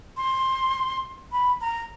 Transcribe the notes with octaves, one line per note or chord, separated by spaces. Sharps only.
C6
B5
A#5